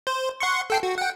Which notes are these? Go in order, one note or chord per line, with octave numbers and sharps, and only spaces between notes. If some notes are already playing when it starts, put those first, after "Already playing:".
C5
F#5 C6 C#6
A4 G5 C7
F#4
F#5 G5